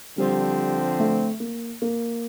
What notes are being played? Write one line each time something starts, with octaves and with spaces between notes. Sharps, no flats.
D3 F3 G3 C4
A3
A#3
A#3